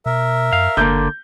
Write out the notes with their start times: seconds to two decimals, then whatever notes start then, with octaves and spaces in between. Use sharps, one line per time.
0.06 B2 A#4 E5
0.53 F#2 F5
0.77 F#1 D3 A#3 G6